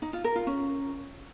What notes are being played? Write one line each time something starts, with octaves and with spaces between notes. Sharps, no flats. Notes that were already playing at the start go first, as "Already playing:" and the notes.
D#4
F4
A#4
F4
C#4